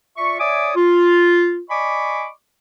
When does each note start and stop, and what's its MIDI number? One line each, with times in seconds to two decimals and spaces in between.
0.17 0.39 65
0.17 0.39 74
0.17 0.39 76
0.17 0.39 85
0.40 0.71 73
0.40 0.71 74
0.40 0.71 76
0.40 0.71 80
0.40 0.71 86
0.40 0.71 87
0.76 1.60 65
1.70 2.29 74
1.70 2.29 75
1.70 2.29 80
1.70 2.29 83
1.70 2.29 85
1.70 2.29 86